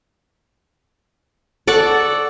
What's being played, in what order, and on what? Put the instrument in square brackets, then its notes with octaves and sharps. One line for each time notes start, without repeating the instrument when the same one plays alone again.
[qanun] A4 D5 F#5 C#6